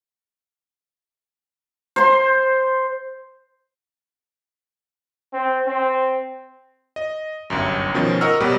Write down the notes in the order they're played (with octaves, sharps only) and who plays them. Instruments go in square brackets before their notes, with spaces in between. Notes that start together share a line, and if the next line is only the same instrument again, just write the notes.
[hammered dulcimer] C5 C6
[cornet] C4
C4
[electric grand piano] D#5
G1 C2 F#2
B2 D#3 F3 C#4
A#4 D#5 F#5 C#6 E6 F6
B2 F#3 G3 B3 G4